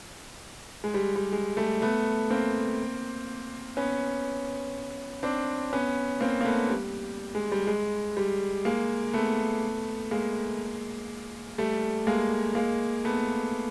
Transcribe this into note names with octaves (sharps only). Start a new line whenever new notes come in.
G#3
G3
G3
G#3
G3 A3
A3 B3
A#3 C4
B3 C#4
C4 D4
B3 C#4
A#3 C4
A#3
A3 B3
G3
G#3
G3
G#3
G3
G#3 A#3
A3 B3
G#3 A#3
G3 A3
G#3 A#3
G#3 A#3
A3 B3